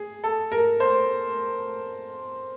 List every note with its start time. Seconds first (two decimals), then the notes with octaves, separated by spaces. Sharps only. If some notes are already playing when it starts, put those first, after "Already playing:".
Already playing: G#4
0.24 A4
0.52 A#4
0.80 C5